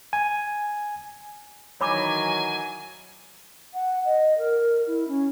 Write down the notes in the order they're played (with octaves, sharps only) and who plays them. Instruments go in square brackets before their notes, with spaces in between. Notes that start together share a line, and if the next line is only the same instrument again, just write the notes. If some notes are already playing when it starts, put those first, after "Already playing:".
[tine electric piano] G#5
[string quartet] D#3 E3 F#3 [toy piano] C#5 B5 D6 [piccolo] G#5
[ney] F#5
D#5
A#4
E4
C#4